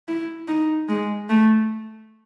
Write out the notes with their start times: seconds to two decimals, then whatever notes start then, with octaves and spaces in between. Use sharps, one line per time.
0.08 E4
0.48 D#4
0.89 G#3
1.29 A3